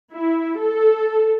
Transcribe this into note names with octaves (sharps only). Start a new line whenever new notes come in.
E4
A4